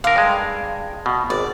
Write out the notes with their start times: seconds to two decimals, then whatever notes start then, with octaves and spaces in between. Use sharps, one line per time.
0.04 D3 A#4 F5
0.16 G2 G#3
1.06 B2
1.30 G#1 D5